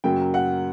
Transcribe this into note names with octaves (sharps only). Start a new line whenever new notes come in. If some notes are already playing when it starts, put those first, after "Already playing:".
F#2 C#3 F#3 A#3 G5
F#5